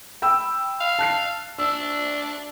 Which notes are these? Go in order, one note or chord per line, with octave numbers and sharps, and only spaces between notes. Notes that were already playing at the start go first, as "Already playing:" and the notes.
G5 B5 E6
F5
A5 F#6 C7
D4 E6